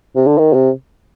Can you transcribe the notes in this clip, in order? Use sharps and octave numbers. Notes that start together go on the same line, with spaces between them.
C3
D3
D#3
C3